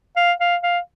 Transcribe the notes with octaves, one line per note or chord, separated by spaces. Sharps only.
F5
F5
F5